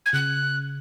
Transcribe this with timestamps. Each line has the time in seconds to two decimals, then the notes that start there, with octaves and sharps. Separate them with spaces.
0.05 G#6
0.13 C#3 F#6